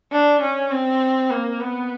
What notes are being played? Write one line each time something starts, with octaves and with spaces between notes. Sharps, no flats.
D4
C#4
C4
A#3
B3